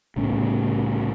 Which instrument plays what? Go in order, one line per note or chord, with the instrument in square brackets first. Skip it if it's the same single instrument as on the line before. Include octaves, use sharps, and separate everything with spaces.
[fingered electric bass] C2 A2 C#3